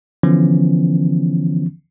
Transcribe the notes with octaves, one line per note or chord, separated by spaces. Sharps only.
D3 E3 F3 B3 C#4